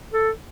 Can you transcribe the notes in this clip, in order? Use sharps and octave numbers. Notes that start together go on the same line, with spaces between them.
A4